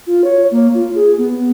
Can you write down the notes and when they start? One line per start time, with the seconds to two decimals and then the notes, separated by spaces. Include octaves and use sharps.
0.07 F4
0.24 C#5
0.51 A#3
0.74 F4
0.95 G#4
1.18 B3